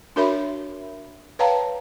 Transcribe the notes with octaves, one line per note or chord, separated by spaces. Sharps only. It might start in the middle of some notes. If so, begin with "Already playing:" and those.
D4 F#4 A#4 C#5 E5 B5
B4 C#5 F5 G5 A5 A#5